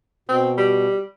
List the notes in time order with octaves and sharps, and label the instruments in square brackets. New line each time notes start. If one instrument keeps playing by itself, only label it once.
[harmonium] B2 [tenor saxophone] C4
[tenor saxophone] G3